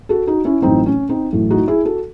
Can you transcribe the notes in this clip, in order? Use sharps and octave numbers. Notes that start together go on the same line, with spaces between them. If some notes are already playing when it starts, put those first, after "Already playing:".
F#4 A4
D#4 F#4
C#4 E4
A1 A2 F#3 A3 C4 D#4
C#4
C4 D#4
A1 A2 F#3 A3
D#4 F#4
E4 G#4
F#4 A4